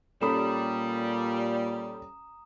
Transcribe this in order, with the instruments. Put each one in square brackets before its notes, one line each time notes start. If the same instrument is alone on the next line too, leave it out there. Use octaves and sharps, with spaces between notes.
[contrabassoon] A#2 [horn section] G3 [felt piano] C#4 A4 B5 [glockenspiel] A#5 D#6 E7